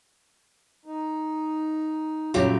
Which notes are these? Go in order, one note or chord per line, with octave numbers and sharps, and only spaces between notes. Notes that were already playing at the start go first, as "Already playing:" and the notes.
D#4
D#1 C#3 F#3 F4 G4 G5